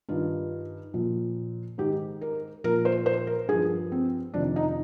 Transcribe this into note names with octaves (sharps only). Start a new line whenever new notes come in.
G2 D#3 F4
A#2 F3
G#2 D#3 G4
A#4
A#2 F3 A#4
C5
C5
A#4
G2 F3 G#4
C4
F2 C3 D#3 D4
D#4